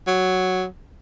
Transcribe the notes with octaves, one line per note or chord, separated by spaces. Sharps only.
F#3